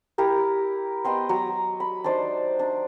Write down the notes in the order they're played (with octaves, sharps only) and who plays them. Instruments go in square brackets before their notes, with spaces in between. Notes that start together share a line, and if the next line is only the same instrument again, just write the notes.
[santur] E4 G4 A#4 G5
B3 D#5 G5 C6
F#3 A#5
B5
D4 D#4 C5 D5
D4